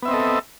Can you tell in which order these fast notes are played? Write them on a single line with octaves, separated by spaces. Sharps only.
B3 E5 C4 D#5 A4